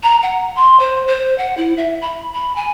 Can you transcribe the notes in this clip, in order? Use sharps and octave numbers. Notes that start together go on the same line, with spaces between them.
A#5
F#5
C6
C5
C5
F#5
E4
E5
B5
B5
G#5